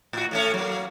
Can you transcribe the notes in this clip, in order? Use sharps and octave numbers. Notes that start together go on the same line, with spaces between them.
A2 F#4
A2 A3 C#4
F#3 A#3